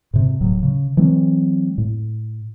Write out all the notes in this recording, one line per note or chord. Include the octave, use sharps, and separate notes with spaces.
G#2 C3
D1 A2 F#3
C#3
E3 F#3 G#3 C4
A2